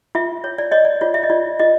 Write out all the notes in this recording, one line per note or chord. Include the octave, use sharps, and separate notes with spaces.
F4 E5
C#5
D5
C#5 D#5
D5
F4 C#5
E5
D#5
F4 D5
F4 D#5